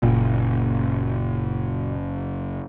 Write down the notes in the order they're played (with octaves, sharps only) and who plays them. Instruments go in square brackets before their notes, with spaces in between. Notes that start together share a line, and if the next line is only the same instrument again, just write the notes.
[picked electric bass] F#1 [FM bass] A#2